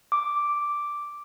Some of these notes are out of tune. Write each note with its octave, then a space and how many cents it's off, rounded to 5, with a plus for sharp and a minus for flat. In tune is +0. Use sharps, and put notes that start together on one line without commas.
D6 +0